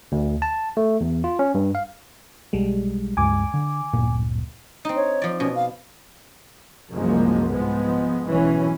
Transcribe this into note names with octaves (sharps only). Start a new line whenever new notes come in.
D2
A5
A3
E2
F4
C#4
G2
F5
B1 G3 G#3
C#2 G2 G#3 G#5 D6
D3
D1 G1 A#2
C4 D#4
C#5
F3 D5
B2 C#4
F5
C2 F#2 F3 G#3 A#3
G#2 F3 G#3 B3
B1 E3 C#4